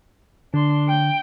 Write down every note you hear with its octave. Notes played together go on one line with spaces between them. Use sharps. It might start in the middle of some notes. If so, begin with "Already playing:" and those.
D3 D4 C6
G5